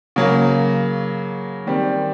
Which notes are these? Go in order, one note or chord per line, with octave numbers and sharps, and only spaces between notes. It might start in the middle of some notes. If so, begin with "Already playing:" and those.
C#3 F#3 A#3
D#3 G3 C4